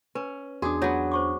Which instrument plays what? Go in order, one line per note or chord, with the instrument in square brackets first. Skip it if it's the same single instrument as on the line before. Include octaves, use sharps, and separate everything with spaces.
[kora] C#4 [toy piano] B4
[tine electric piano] E2 D4 [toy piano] F#4 D6 D#6 [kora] G#4
[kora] F#3 B3 [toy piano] C#5
[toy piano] C5 C#6 D6